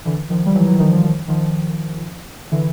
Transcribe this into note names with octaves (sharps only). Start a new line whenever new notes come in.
D3 E3
D#3 F3
G3
E3 F#3
E3 F#3
D#3 F3
D#3 F3
D#3 F3
D#3 F3
D3 E3